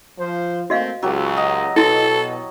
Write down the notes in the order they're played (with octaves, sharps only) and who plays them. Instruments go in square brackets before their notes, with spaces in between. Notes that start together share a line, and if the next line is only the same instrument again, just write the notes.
[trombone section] F3 C5
[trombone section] A3 A#3 C4 [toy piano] F#4 D#5 F5
[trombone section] C#2 [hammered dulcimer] F#3 G4
[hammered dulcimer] D#5
[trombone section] B2 [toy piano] E4 F#4 [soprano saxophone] A4